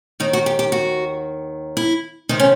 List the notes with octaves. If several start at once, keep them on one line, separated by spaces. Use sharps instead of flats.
D#2 D#3 D#4
F#4
G4
G4
F#4
E4
C3 D#3 D#4
C#4